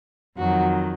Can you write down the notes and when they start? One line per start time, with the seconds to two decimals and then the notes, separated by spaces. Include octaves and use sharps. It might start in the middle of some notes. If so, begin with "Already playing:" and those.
0.37 F2 D#3 F#3 F#4